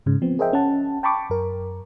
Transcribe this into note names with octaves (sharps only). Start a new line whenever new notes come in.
G#2 C#3
F3 B3 C4
G#4 A#4 C5 D#5 E5 G5
C#4 F#5 A5
G5 A5 B5 C#6 D6
F#2 A#4